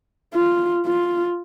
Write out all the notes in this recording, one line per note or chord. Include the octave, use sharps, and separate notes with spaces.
F4
F4